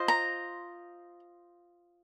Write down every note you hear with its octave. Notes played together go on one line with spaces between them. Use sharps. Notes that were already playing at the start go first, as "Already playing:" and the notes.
Already playing: F4 C5 D#5
A#5